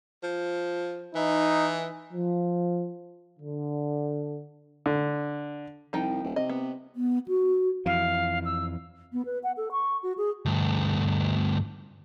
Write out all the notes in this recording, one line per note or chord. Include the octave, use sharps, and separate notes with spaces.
F3
E3 D#4
F3
D3
D3
C2 F3 D#4 G5
D#1
C3 D#5
B3
B3
F#4
F2 E3 F5
E6
B3
B4
F#5
A4
C#6
F#4
G#4
D2 G2